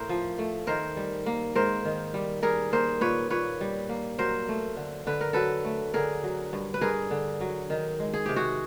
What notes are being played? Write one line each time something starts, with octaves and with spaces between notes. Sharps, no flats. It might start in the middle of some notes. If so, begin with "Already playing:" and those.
Already playing: A2 A#4 C5
F3
A3
D#3 A#4 C5
G3
A#3
G#2 A#4 C5
D#3
G3
G3 G#4 A#4
A#3 A#4 C5
A#2 B4 C#5
A#2 B4 C#5
G3
A#3
F#3 A#4 C5
A3
D3
D3 B4
A#4
F#3 A4 B4
A3
D3 G#4 A#4
F#3
G2
B4
G2 G#4 A#4
D3
F#3
D#3
G#3
G#4
C3 G4
F#4 G#4